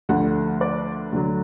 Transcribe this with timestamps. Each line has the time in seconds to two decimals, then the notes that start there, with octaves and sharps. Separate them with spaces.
0.09 D2 D3 F3 F#5
0.61 D5
1.12 D2 D3 F#3